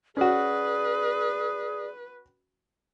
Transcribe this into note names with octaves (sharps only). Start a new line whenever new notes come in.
C#4 F#4 G#4 B4 D5